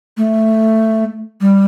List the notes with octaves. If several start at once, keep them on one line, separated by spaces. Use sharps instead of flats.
A3
G3